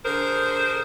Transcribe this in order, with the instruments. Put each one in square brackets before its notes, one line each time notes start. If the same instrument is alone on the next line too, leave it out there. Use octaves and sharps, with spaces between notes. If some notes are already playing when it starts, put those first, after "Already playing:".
[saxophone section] D3 G#4 A#4 C5